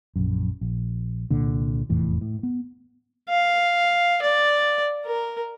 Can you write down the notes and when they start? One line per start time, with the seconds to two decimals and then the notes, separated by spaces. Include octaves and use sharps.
0.16 A#1 F#2
0.61 A#1
1.31 C2 A#2 D3
1.90 F1 E2 A2 E3
2.21 A2
2.43 B3
3.30 F5
4.23 D5
5.06 A#4